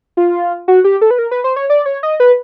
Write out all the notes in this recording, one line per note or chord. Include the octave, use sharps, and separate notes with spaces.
F4
F#4
G4
A4
B4
A#4
B4
C5
C#5
D5
C#5
D#5
B4